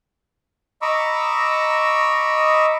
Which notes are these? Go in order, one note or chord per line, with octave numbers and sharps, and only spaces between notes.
D#5 A#5 B5 C#6 D6 E6